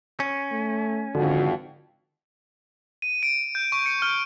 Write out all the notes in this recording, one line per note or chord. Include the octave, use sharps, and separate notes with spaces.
C#4
A3
G#1 F2 D3 F#4
D#7
D7
G6
C#6
C#7
F6